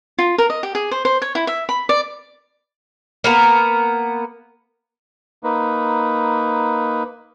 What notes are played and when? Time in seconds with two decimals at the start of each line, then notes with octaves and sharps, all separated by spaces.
0.18 F4
0.38 A#4
0.50 D#5
0.63 G4
0.75 G#4
0.91 C5
1.05 C5
1.22 C#5
1.35 E4
1.47 E5
1.69 B5
1.89 D5
3.24 A#3 B3 A#4
5.44 A#3 D#4 B4